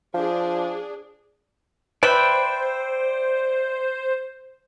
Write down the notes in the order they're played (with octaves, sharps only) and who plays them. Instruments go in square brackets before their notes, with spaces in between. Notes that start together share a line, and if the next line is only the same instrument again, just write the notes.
[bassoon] F3 [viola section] D4 G#4
[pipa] B4 [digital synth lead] C5 [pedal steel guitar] D5 E5 G5